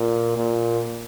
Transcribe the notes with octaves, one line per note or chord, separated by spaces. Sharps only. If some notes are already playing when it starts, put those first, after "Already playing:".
Already playing: A#2
A#2